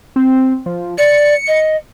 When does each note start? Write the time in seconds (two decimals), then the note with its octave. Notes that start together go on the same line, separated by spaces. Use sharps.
0.16 C4
0.66 F3
0.98 D5 C#7
1.47 D#5